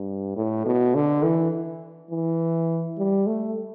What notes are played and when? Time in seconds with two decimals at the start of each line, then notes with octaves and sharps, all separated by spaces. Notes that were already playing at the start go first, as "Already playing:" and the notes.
Already playing: G2
0.36 A2
0.66 B2
0.95 D3
1.24 E3
2.11 E3
2.98 G3
3.27 A3